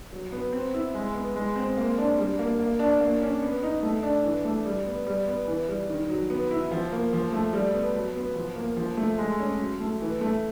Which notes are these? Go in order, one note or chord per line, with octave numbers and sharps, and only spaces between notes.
F#3
B3
C4
E4
G#3
B3
G#3
C4
A#3
D4
G3
A#3
A#3
D4
A#3
C#4
B3
D#4
A3
D4
E3
A3
G3
B3
G3
B3
E3
G3
D#3
F#3
B3
E4
F3
A#3
F3
A3
G3
B3
F#3
B3
F3
A#3
F3
A3
G#3
C#4
F#3
A3
E3
A3